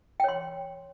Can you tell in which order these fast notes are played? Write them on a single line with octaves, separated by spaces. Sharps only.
G5 C#5 C6